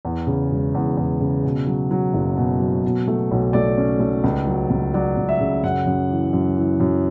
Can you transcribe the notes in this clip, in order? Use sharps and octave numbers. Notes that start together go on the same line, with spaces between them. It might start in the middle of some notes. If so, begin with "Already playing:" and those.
E2
C#3
E1
E2
E2
C#3
B2
F#3
F#3
F#1
B2
F#3
B2
A3
B1
A3 D5
C#4
A3
C#2
F#3
C#2
F#3 D5
C#2
E5
C#3
F#2 F#5
F#2
E3
F#2
E3
F#2